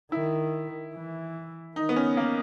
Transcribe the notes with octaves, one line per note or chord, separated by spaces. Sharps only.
D#3 E4
E3
D#3 D#4
B3
C#4
A#3